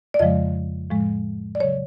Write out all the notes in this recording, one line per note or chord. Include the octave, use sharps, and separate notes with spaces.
D5
F2 C#3 F3 G#3 D#5
A2 F3 G#3
D5
C#3 F#3 C#5